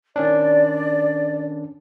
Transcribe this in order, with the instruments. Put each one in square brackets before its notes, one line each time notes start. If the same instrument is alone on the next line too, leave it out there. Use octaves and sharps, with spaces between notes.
[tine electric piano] D#3 C#4 D4 [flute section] D5